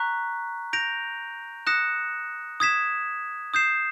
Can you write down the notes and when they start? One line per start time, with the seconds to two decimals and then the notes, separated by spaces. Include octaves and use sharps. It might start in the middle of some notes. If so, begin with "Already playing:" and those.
Already playing: A#5 C#6 F#6 B6
0.73 G6 A#6 D7 F7
1.67 D#6 F#6 A#6 C#7 E7
2.60 D#6 G#6 B6 E7
3.54 D#6 G6 C7 E7